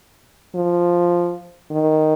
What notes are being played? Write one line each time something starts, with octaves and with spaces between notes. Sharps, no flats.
F3
D#3